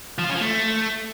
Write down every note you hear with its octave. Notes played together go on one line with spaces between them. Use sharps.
F3
F4
C#4
F3
A3